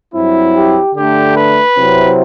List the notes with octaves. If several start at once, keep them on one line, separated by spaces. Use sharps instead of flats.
G2 F#3 C4 E4
G4
D3 A3 D4 G4
B4
C3 F#3 C4 E4